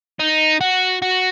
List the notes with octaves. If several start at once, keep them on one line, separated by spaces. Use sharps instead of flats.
D#4
F#4
F#4